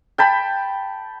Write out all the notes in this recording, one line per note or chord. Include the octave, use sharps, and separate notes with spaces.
G5 A5 B5